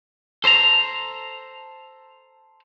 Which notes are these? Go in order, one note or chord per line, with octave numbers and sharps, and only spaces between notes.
A4 C5 A5 A#5